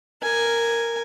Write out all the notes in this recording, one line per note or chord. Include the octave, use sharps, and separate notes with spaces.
A#4 G#5